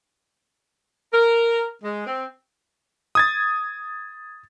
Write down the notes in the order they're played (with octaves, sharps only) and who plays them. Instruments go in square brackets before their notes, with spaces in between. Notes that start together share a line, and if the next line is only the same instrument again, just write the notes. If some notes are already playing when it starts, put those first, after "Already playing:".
[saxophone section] A#4
G#3
C4
[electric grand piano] D#6 G#6 A6